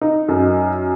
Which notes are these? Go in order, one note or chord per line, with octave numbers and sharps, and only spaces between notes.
D#4
F#2